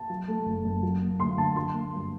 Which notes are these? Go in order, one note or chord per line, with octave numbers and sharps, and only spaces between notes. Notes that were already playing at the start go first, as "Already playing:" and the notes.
Already playing: A5
F#3
A3
F#1
F#2
F#3
A#3
D2 C6
D3 A5
F#3 C6
A#3
G2